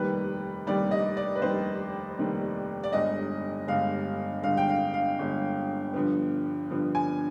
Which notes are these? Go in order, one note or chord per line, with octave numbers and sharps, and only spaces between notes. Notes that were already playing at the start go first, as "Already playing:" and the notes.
Already playing: F1 D#2 D#3 G3 B4
F1 D#2 D#3 G3 D5
D#5
D5
B4
F1 D#2 D#3 G3 C5
F1 D#2 D#3 G3
D5
G1 G2 D3 G#3 D#5
G1 G2 D3 G#3 F5
G1 G2 D3 G#3 F5
G5
F5
F5
G1 G2 D3 G#3
G2 D3 F3 B3
G2 D3 F3 B3
G#5